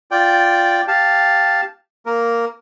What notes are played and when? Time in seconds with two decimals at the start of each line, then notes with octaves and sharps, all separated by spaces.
0.11 F4 D5 G5
0.88 G4 F5 A5
2.06 A#3 A#4